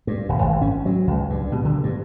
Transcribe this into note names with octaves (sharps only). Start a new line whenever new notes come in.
G2
D#1
G#1
C#4
F#3
C#2
G2
B2
D3
G2